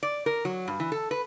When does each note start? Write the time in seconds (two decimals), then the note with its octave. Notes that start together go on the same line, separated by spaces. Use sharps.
0.03 D5
0.26 A#4
0.45 F#3
0.68 G2
0.80 E3
0.92 A4
1.11 B4